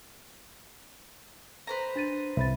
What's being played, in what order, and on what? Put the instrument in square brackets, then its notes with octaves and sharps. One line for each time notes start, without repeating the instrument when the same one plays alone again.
[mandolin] B4 C5 A#5
[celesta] D4 A6 D#7
[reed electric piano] C2 [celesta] E5 B5 A6